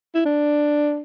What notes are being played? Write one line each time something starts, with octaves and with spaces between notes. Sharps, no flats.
E4
D4